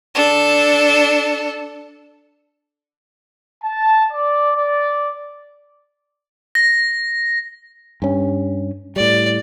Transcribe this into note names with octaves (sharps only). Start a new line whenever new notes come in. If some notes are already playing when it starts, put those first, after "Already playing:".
D4 A4
A5
D5
D5
A#6
G2 C#4
A2 G3 D5